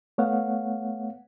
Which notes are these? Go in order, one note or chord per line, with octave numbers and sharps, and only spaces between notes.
A3 B3 C#5 F5 F#5